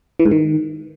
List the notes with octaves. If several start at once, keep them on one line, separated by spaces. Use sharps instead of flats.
E3
G#2
D#3